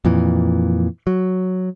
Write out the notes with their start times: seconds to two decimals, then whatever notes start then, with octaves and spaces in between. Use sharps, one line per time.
0.05 F2 A#2 E3
1.07 F#3